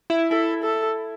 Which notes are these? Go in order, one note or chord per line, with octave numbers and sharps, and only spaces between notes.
E4
E4 A4
A4